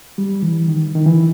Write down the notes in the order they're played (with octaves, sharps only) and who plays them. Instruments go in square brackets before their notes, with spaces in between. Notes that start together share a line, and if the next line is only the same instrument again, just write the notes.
[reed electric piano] G3
E3
D#3
D#3
E3